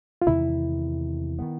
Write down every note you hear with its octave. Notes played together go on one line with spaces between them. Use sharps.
F4
E2 C3 D#3 G#3 E4
D#3 G#3 B3